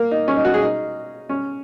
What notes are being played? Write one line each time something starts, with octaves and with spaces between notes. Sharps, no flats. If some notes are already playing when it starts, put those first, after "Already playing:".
Already playing: A#3
D#4
C#4
D#4
F#4
G#4
D#4
C#4